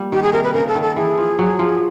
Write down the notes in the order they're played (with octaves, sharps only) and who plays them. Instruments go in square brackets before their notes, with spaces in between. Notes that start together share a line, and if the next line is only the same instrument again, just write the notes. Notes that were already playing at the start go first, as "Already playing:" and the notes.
Already playing: [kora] G3 A#3
[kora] D#3 [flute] G4
[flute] G#4
[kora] C3 [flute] A#4
[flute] B4
[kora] C#3 [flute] A#4
[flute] A4
[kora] D#3
[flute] A4
[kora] E3 [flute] G#4
[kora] F3
F#3
F3